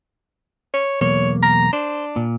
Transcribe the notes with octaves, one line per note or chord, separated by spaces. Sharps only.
C#5
B1 E2 A#3 C#5
A#5
D4 C5
A#2